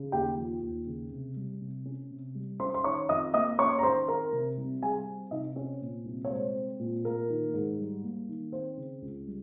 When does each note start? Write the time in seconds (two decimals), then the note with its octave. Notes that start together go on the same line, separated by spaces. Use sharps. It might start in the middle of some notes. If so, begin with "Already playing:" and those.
Already playing: C#3
0.12 D#2 G4 G5
0.38 F3
0.62 D#2
0.87 C#3
1.11 C3
1.36 G3
1.61 C3
1.86 C#4
2.10 C3
2.35 G3
2.60 C#4 C5 C6
2.74 C6
2.84 D#3 C#5 C#6
3.09 F2 D#5 D#6
3.34 A#3 D#5 D#6
3.58 C#4 C#5 C#6
3.79 A#5
3.83 D#3 C5 C6
4.08 C4 A#4 A#5
4.32 C3
4.57 C2
4.82 G3 G#4 G#5
5.07 C4
5.31 C3 D#4 D#5
5.56 C4 C#4 C#5
5.81 A#2
6.05 C2
6.25 C#5
6.30 G#3 C5
6.55 C4
6.79 A#2
7.04 A#3 A#4
7.30 D#3
7.54 G#2
7.79 G3
8.03 A#3
8.29 D#3
8.52 C4 C5
8.77 C#3
9.02 C#2
9.27 G3